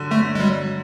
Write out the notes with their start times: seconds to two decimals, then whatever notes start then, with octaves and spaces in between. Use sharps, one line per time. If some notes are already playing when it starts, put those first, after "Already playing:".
Already playing: D3 F#3
0.11 D3 A3
0.35 G#3
0.39 F#3 G3